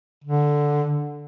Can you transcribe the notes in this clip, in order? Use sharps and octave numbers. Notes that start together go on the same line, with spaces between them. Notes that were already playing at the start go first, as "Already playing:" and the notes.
D3